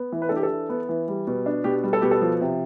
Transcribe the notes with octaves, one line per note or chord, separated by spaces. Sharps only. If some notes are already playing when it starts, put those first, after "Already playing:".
Already playing: B3
E3
B4
D4 A4
G4
A4
E3
B3
E3
G3
B2
D4
B2 G4
G3
A4
B2 G4
A4
F3
C3